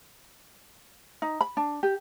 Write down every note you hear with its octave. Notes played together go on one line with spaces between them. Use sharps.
D#4
B5
D4
G4